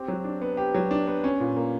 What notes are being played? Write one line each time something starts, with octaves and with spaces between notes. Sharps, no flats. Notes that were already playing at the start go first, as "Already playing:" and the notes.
Already playing: C4 G4
F#3
D4
B3
G4
F#3
D4
B3
C#4
A#2
A#3